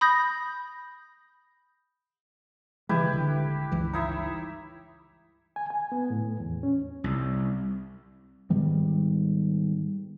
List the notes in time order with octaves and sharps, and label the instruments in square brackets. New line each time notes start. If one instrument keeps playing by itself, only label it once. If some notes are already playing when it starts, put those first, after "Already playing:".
[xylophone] B5 D#6 G6 A#6
[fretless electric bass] C#3 E3 G#3 [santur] E4 G4 B4
[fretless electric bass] D#1 D3
G1 C#2 E3
[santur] D#4 E4 E5
[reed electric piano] G#5
G#5
B3
A2
E2
C#4
[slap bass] C2
[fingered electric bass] G#2 D#3 G3 B3